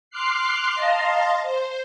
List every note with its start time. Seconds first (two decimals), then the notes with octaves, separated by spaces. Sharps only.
0.10 C6 D6 F6 F#6 C7
0.75 D#5 F5 A5 A#5 C6
1.42 C5